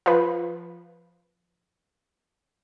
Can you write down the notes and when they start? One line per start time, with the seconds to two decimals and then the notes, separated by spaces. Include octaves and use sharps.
0.06 F3 B4